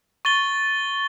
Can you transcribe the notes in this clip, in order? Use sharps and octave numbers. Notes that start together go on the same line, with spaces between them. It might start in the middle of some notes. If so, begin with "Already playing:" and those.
C#6 A6 G7